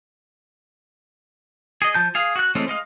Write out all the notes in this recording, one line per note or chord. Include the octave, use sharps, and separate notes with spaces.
G#4 D#5
F3 A5 G6
G#4 F5
F#4 F#6
E3 G#3 A3 C4 C#4
G#3 D#5 F5